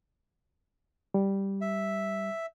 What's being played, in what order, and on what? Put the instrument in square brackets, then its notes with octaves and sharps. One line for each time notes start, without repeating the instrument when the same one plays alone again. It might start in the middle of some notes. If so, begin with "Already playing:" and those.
[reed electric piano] G3
[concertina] E5